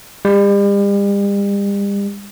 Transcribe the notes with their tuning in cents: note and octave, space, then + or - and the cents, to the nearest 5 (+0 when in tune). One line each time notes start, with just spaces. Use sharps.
G3 +40